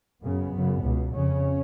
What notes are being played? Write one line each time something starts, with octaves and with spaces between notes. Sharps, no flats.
F#2 C#3 B3
F#2 C#3
C#2 B2
F2 C#3 C#4